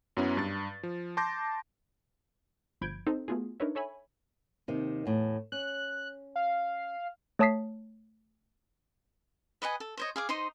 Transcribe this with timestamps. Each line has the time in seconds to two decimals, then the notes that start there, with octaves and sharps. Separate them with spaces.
0.17 F#2 F#3 B3 C#4 E4
0.37 G2 A6
0.83 F3
1.17 A5 C6 D6 G6 A#6
2.81 G1 F3 B5 G6 G#6 D7
3.07 C4 D#4 A4 C5
3.28 A3 B3 F4 F#4 G#4
3.60 D4 D#4 A#4 B4 C#5 E5
3.75 A4 C#5 E5 G#5 B5
4.68 D#2 C3 D#3
5.06 E2 A2
5.52 C#4 F#6
6.36 F5
7.39 A3 C#5 A5 D#6 B6 C7
9.62 B4 D#5 F#5 G#5
9.80 A4
9.97 C5 C#5 D#5
10.16 G#4 F5 D6
10.29 D#4 C5 D#5 C6